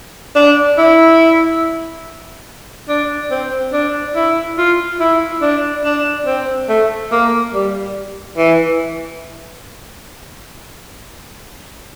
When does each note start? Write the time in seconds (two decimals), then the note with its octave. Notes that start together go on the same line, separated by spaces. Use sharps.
0.35 D4
0.78 E4
2.89 D4
3.31 C4
3.73 D4
4.16 E4
4.58 F4
5.00 E4
5.42 D4
5.84 D4
6.26 C4
6.69 A3
7.12 A#3
7.54 G3
8.38 E3